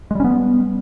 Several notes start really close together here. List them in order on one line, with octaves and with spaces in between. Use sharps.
G#3 G3 C#4 B3